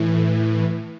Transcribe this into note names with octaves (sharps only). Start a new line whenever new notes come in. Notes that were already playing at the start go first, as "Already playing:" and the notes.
Already playing: A2 E3